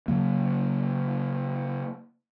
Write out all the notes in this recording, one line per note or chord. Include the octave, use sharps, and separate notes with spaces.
C#3 F#3 A#3